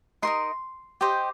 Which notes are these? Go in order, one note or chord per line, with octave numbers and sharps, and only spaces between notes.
D#4 A#4 D#5 C6
G4 C5 D#5